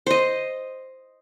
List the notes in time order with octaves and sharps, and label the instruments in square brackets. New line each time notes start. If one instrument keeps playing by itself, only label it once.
[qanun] C5 D#5